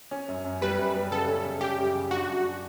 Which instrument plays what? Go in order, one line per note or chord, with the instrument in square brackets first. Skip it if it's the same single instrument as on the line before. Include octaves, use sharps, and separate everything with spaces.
[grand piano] C#4
F#2
F#2
[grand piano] G3 [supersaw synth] B4
[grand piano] F#2
G3
[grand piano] C#3 [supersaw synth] A4
[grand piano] C#4
C#3
[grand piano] C#4 [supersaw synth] G4
[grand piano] F#2
C#3
[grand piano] D4 [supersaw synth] F#4
[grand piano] F#2
D4